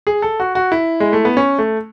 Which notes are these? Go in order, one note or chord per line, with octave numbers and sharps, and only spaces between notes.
G#4
A4
F#4
F#4
E4
G#3
A3
B3
C#4
A3